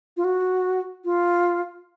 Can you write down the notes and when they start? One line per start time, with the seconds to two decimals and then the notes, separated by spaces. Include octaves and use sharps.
0.17 F4
0.24 F#4
1.05 F4